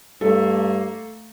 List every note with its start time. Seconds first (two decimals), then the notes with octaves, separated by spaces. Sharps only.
0.21 G2 A3 A#3 A4